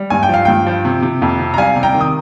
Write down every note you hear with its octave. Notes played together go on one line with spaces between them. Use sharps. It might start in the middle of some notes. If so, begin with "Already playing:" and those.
Already playing: G3
G2 G#5
G5
F3 F5
G2 G5
F3
C3
C3
F2
C3
A#5
G3 F5 G#5
C3
G5 A#5
D#3
D#6